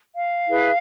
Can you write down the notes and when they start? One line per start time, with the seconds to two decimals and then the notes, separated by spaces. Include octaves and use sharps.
0.15 F5
0.47 E4 G#4 B4